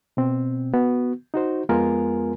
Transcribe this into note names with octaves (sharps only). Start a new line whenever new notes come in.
B2 C4
B3 F#4
D#4 F#4 C5
F2 G#3 B3 F4 A#4 G#5